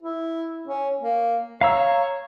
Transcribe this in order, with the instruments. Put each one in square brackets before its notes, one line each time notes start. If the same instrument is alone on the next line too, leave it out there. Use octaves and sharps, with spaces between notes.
[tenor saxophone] E4
C#4
A#3
[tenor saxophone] C#5 [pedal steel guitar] F5 A#5 E6